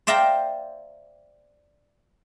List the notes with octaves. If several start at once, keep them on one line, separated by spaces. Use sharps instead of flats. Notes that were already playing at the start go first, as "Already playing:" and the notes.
C5 D5 E5 F5 G5 A#5